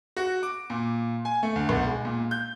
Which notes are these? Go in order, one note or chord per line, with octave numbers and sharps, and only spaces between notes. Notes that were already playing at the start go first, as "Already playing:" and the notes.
F#4
D6
A#2
G#5
A3
D2
B1
G#3
A#2
G6